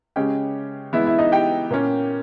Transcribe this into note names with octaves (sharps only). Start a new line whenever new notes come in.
C#3 G#3 C#4 G4 G5
E3 G#3 B3 E4 E5
E4 E5
D#4 D#5
G4 G5
A#2 A#3 C#4